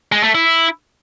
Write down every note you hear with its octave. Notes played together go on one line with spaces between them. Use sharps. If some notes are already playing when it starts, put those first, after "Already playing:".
G#3
A3
E4